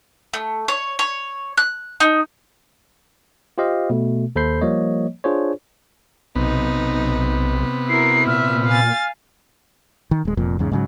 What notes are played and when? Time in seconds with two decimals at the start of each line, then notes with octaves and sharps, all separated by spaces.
0.33 A3
0.68 C#5
0.99 C#5
1.57 F#6
2.00 D#4
3.58 F4 G4 C5 D#5 F5
3.90 B2 A3
4.36 D#2 A4 C5 B5 G6 C7
4.61 F3 G3 A#3 C#5 D#5
5.24 D4 F4 G#4 C5 C#5
6.35 B1 C3 B3 D#4
7.89 E4 F#4 A#4 C7
8.27 A#2 E5 F6
8.67 F5 G#5 A6
10.11 D#3
10.25 D1 G#3
10.37 F1 F2 A#2
10.59 E2 G#2 C#3
10.72 G#2 C#3 F#3